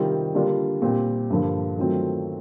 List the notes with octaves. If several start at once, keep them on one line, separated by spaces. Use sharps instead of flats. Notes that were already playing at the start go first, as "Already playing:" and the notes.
Already playing: C3 D#3 G3 C4 F4
D3 G3 A#3 D4 F4
A#2 G3 C4
G2 D3 F3 A#3
D#3 F#3 A3 C4 F4